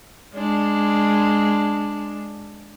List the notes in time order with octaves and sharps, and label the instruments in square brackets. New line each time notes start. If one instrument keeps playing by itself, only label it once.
[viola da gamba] G#3 D4